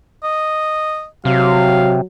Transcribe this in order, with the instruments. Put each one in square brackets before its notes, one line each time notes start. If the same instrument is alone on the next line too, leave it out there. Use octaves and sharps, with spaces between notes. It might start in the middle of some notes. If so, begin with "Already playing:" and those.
[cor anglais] D#5
[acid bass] C3 [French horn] F#3 [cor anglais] F5